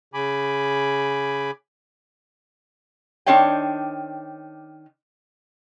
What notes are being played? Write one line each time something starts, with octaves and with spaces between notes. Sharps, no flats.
C#3 G#5 B5 D6
D#3 C4 D4 C#5 F5 G5